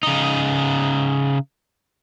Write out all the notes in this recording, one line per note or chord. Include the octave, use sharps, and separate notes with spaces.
C#3 D#4